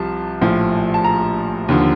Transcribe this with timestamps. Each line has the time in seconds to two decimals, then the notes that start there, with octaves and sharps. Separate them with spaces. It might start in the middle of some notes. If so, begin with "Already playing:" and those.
Already playing: C2 C3 F3 A5
0.41 A#1 A2 F3
0.94 A5
1.04 A#5
1.68 D#2 D3 F3